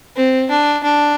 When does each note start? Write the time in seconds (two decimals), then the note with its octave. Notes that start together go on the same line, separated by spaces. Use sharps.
0.16 C4
0.50 D4
0.84 D4